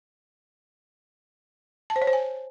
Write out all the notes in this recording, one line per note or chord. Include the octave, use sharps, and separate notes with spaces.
A5
C5
C#5
C5
G#5